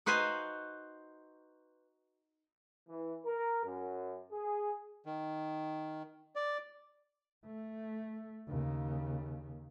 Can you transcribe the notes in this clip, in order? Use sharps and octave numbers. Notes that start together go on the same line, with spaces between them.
D#4 F#4 B4 C5 F5 G#5
E3
A#4
F#2
G#4
D#3
D5
A3
D#2 C#3